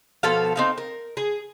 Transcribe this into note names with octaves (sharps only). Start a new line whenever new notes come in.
B2 F3 A4 F5
C4 D#4 F5
A#4
G#4